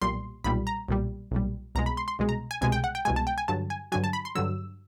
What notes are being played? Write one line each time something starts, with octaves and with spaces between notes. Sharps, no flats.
B1 A#2 G3 C6
B1 A#2 G3 B5
A#5
B1 A#2 G3
B1 A#2 G3
C2 B2 G#3 A#5
B5
C6
C6
C2 B2 G#3
A#5
G#5
C2 B2 G#3 G#5
G5
F#5
G5
C2 B2 G#3 G#5
A5
G5
G#5
G2 D3 F#3 A5
G#5
G2 D3 F#3 G#5
A5
B5
C6
G2 D3 F#3 E6